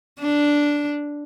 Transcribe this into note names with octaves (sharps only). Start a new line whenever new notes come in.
D4